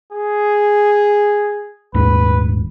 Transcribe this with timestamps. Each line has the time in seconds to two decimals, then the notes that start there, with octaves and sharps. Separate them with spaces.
0.12 G#4
1.94 D#1 D#2 G#2 B4